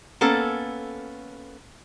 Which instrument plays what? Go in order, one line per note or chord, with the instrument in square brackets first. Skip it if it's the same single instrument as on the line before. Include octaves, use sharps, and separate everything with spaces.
[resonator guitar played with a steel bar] A#3 B3 C#4 A4